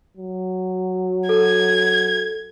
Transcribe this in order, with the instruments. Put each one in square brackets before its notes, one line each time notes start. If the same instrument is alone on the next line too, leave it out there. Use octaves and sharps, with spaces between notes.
[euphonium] F#3
[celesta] A4 [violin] G#6